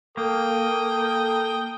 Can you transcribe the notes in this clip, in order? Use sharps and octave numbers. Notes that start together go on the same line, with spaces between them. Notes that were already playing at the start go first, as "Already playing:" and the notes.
A#3 A4 G5 D#6